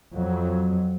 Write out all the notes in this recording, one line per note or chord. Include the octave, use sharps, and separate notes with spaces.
F2 F#3